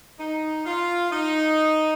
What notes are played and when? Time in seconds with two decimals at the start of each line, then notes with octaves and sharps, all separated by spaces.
0.18 D#4
0.65 F4
1.11 D#4